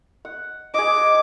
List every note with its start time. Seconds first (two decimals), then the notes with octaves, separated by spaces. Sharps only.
0.25 F#5
0.74 G#4 D#5 D6